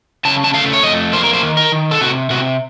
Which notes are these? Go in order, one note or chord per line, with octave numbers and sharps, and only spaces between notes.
C#3 A5
A5
A3 F5
C#5
F2 D#5
A#3 C5
A#4
C5
D#3
A#4
D#3
A4
C3 F#4
C3 F#4